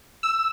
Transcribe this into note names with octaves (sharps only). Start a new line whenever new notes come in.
E6